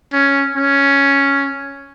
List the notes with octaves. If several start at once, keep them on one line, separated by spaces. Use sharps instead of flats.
C#4
C#4